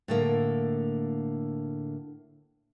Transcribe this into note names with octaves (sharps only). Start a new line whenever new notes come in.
A2 D3 A#3